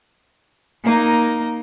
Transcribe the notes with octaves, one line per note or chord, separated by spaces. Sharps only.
A#3 D#4